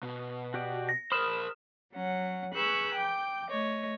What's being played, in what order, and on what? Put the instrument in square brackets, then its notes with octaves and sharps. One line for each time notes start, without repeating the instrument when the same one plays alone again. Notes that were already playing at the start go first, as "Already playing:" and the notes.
[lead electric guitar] B2
[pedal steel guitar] F#4 G4 D5
[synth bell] A#6
[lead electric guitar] A#4 C5 [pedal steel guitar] B5 [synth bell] D#6 F6 E7
[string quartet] F#3 C#4 F#5
G#4 B4 C#6 E6 F#6 G6
G5 D6 G6
A3 C#5 D#5